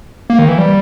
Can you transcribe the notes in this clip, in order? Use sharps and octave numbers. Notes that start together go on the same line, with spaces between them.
A#3
D#3
E3
G3